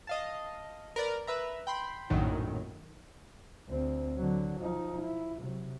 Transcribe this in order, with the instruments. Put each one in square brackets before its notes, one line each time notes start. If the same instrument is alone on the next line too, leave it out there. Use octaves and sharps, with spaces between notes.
[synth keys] D#5 F5 A5
A#4 B4 D5
B4 E5 A#5
G5 B5 C6
A#1 F#2 A2 D#3 F#3
[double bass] D2 C4
D3 F#3
F3 D#4
E4
C3 F#3